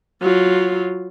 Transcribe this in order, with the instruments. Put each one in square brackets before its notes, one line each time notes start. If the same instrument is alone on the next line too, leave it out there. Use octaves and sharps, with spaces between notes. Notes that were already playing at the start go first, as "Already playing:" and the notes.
[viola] F#3 F4